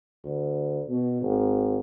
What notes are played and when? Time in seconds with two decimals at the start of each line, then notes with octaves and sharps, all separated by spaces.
0.24 D2
0.88 B2
1.22 G#1